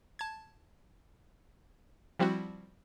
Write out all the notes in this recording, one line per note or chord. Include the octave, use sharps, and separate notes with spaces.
A5 G#6
F3 G3 C4 E4 F#4